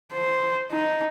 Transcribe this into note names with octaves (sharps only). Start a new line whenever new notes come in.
C5
D#4